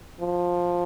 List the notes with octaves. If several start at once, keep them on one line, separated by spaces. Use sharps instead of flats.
F3